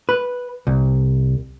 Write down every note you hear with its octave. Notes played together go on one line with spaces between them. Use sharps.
B4
C2